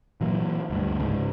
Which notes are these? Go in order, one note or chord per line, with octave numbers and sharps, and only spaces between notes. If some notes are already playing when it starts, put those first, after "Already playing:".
A#2 E3 F#3 A#3
D2 G2
C#2 G#2